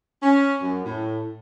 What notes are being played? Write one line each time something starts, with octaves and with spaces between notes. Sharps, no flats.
C#4
F#2
A2